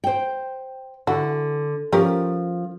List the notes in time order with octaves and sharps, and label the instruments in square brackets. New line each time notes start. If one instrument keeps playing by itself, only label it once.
[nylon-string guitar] C5 G5
[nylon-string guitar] D3 [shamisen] E3 F#4
[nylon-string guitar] F3 [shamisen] C#4 G4 A#4